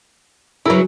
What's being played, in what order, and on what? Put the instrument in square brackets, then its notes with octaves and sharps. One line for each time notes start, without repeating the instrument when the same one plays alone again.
[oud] C#3 F#3 [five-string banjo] E4 A#4 B4